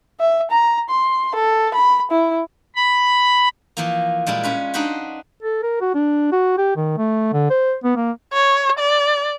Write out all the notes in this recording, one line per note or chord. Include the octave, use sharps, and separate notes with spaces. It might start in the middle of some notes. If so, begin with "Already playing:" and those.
E5
A#5
C6
A4
B5
E4
B5
E3 F3 A#3
A#2 G3 G#3 E4
C#4 F4 B4
D4 D#4 F#4 B4 C5
A4
A#4
F#4
D4
F#4
G4
D#3
A3
D3
C5
B3
A#3
C#5
D5